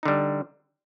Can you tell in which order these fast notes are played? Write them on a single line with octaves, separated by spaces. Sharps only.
D#4 D3 G3